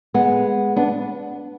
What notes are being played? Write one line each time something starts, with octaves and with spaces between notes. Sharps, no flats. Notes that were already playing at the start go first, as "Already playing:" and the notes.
G#3 B3
B3 D4